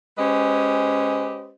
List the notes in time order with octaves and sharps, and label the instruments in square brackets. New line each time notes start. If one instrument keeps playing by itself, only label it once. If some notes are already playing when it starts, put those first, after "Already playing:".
[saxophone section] G#3 C#4 G4 B4 C5 D#5